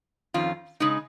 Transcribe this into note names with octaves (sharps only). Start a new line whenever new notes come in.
F2 D#3 C#4 F4
C#3 G#3 D#4